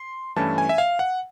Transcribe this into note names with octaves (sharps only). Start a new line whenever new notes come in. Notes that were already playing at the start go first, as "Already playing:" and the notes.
Already playing: C6
G2 E3 A3 C#4 E4 A5
G#5
E5
F5
F#5